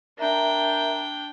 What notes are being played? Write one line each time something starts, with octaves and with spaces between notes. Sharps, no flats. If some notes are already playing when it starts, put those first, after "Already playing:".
D4 A#4 E5 G5 A#5